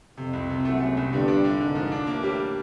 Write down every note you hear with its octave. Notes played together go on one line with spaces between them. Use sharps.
F2 C3
C2
C3
F#1 F#2 A3
A3
C2
G1 G2 D3
D4
D3
G#1 G#2 D3
F3
D4
A1 A2 A#3
G3